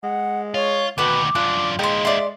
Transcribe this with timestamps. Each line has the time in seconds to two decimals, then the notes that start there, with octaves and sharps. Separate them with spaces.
0.03 G#3 F#5
0.54 F4 C#5
0.98 D2 B2 D#3 B4 F#5 A5 D6
1.35 F#2 D4 F4 F#6
1.79 G#3 D#4 F4 G5 C6
2.05 D5 E5 C6